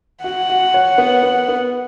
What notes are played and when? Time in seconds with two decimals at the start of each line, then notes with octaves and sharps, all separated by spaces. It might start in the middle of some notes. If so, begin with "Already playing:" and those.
0.24 F#4 F#5
0.49 F#4
0.74 C#5
0.98 B3
1.23 B3
1.48 B3